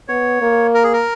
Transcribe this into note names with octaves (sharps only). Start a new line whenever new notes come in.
B3 C#5
A#3
A#4
G#4
A#4